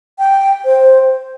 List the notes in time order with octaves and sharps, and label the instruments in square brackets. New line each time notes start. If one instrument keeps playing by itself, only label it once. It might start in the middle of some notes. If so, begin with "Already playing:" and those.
[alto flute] G5
C5